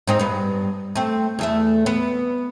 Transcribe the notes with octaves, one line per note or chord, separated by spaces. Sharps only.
G#2 C4 D#4
G2 B3
A3 C4
E2 A3 E5
B3